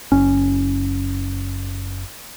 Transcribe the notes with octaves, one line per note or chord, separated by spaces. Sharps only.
F#1 C#4